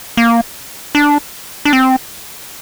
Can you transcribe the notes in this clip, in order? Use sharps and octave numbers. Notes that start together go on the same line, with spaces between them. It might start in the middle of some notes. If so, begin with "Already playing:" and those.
A#3
D4
D4
C4